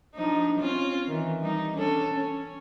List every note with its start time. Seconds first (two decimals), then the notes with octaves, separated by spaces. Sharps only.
0.16 F3 D4 D#4
0.59 C4 C#4 F4
1.07 D#3 E3
1.41 G3 D#4
1.75 C#4 D4 A4
2.13 C#4